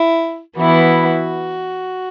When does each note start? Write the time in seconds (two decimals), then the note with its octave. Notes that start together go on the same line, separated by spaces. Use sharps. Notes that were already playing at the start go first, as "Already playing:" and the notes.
Already playing: E4
0.56 E3 B3 E4 F#4